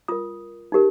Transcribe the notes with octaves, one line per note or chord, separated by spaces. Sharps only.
F4 A#4 D#6
D#4 G4 A#4